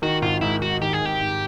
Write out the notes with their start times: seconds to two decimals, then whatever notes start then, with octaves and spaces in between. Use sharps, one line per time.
0.02 D#3 F#4
0.22 G#1 F4
0.41 G#2 E4
0.61 G#1 F#4
0.81 D#3 G4
0.93 G#4
1.01 G#1 G4
1.21 G#2